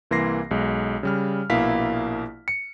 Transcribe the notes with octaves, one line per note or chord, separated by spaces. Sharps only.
C2 E3 A#3 C6 A#6 C7
B1 G#3
C#3 G3 F6
A#1 B2 A#3 E4 F5 B6
C#7